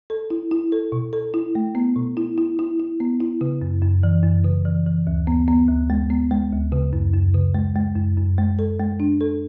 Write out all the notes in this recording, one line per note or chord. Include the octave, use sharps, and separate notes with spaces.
A4
E4
E4
A4
B2
A4
E4
A3
B3
B2
E4
E4
E4
E4
B3
E4
C#3
F#2
F#2
E3
F#2
C#3
E3
E3
D2
B3
B3
D2
G#3
B3
G#3
D2
C#3
F#2
F#2
C#3
G#3
G#3
F#2
F#2
G#3
A4
G#3
D4
A4